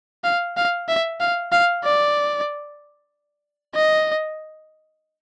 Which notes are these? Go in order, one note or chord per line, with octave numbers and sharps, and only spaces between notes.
F5
F5
E5
F5
F5
D5
D#5